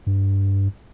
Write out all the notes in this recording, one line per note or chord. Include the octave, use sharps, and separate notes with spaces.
G2